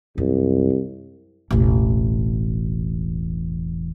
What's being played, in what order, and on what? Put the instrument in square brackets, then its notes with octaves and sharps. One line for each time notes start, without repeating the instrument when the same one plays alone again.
[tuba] C2 [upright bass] F#2
[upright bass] E1 A1